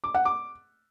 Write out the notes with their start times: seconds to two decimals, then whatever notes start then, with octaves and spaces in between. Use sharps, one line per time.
0.04 D6
0.15 F#5
0.25 D6